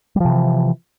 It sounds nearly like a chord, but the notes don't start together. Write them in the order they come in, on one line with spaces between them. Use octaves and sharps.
G3 F3 C3 E3